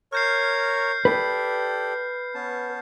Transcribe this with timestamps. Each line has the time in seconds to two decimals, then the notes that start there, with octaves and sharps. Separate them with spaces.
0.13 A#4 C#5 F6 G6 C7
1.05 G4 A4 B4 D5
2.34 B3 C#4 A5